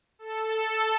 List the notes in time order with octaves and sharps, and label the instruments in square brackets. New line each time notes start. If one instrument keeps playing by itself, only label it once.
[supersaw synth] A4